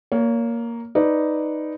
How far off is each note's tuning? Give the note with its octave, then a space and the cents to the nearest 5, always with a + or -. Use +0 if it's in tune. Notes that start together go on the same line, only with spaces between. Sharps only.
A#3 +0 C#5 +30
D#4 +0 B4 +0 D5 +0